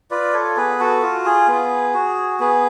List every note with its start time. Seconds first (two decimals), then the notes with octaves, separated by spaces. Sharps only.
0.11 F4 B4 D5
0.34 A4 C#5
0.56 B3 G#4 B4
0.80 F#4 A4
1.02 F4 F#4
1.26 G#4
1.48 B3
1.94 F#4
2.40 B3 G#4